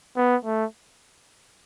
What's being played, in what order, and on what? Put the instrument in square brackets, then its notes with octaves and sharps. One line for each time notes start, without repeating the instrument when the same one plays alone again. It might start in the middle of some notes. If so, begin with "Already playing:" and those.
[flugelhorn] B3
A3